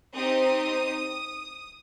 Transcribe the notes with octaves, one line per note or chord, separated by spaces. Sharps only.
C4 D#4 G4 D#6